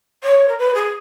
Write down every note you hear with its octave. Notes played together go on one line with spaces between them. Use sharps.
C#5
A#4
B4
G#4